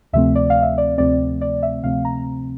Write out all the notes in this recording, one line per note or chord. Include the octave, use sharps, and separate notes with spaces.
D2 C3 F3 A3 C4 E5
D5
F5
E5
D5
D2 C3 F3 A3 C4 D5
D5
E5
D2 C3 F3 A3 C4 F5
A#5